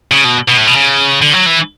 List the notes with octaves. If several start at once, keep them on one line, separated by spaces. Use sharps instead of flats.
C#3
B2
B2
A2
B2
C#3
D3
F#3
E3